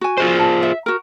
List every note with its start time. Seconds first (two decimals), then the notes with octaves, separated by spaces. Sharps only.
0.01 F#4 G#5
0.18 F4 G#4 C5
0.39 A5
0.63 E5
0.86 F#4 A#4